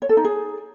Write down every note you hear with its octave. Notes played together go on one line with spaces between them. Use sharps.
C#5
A4
D#4
G#4